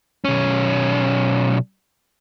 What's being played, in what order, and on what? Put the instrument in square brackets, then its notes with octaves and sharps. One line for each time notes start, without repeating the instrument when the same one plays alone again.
[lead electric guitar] B1 C#4